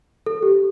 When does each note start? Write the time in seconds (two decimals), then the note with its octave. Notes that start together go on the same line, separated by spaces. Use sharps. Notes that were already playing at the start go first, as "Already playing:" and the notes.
0.26 A4
0.43 G4